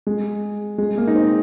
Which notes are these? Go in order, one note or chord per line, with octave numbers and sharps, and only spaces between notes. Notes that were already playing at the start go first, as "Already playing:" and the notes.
G#3
G#3
A#3
D#4
C4